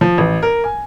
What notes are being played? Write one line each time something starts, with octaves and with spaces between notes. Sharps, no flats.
F3
A1
A#4
G#5